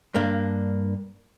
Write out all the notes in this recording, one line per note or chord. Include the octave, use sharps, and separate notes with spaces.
G2 A#3 D4